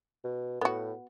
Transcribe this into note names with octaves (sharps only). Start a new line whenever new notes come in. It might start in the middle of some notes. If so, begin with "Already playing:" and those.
B2
A2 B3 F#4